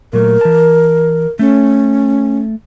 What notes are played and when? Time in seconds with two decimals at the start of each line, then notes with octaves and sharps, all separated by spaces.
0.13 A#2 F#3 A3 A#4
0.41 E3 A5
1.39 A3 C#4 A4